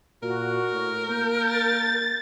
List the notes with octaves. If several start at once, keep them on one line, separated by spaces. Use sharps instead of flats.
A#2 F#4 A#4
A2
A#3 G6
A6